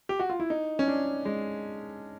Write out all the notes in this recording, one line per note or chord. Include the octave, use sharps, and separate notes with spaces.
G4
F#4
F4
E4
D#4
C#4
D4
G#3